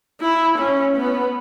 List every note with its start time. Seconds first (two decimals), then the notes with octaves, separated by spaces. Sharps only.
0.21 E4
0.59 C#4
0.97 B3